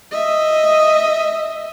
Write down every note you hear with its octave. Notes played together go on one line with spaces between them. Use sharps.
D#5 E5